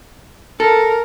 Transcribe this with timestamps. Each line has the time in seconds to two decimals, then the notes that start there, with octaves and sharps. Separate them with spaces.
0.60 A4 A#4